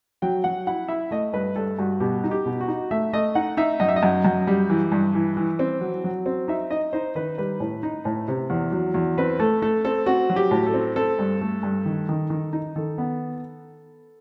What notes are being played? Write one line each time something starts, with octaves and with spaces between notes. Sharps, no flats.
F#3 G5
F#3 F#5
E4 F#5
E4 E5
A3 D#5
G2 B4
G2 A4
G2 F#4
B2 G4
D#4
G4
B2
F#4
D#4
A3 E5
A3 D#5
D#4 F#5
D#4 E5
F#2 D#5
E5
D#5
F#2
F#2
G3
E3
G2
E3
E3
C4
F#3
F#3
C4
D#4 E5
D#4 D#5
D#4 C5
D#3 B4
G3 B4
A2
D#4
A2
C3
E2
F#3
E2
C4 B4
A3 A4
A3 A4
C4 A4
C4 F#4
F#3
G4
A2
A4
C4
C4 A4
G2
A3
G2
D#3
D#3
D#3
D#4
D#3 A4
B3